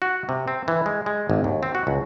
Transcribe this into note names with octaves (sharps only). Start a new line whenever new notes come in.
F#4
C3
C4
E3
G#3
G#3
G#1
D#2
C4
F#4
C#2